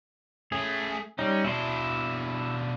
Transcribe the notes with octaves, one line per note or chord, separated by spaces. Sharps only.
A3 C#4 G#4
G3 C#4 D#4
B2 D4 E4 C6